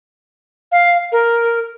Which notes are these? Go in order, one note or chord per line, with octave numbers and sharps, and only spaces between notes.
F5
A#4